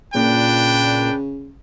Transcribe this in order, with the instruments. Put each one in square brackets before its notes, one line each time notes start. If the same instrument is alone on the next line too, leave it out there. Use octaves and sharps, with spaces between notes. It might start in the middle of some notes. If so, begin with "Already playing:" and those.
[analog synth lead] A#2 [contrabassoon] C#3 [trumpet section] D4 B4 G5